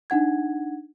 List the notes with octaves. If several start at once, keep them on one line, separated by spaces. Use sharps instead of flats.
D4 D#4 F#5 G#6